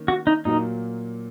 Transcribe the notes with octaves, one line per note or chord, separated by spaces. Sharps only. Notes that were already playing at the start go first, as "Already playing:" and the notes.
Already playing: D#3 A#3 C#4
F#4
D#4
A#2 F#3 A#3 D#4